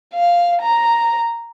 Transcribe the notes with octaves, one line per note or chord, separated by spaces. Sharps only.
F5
A#5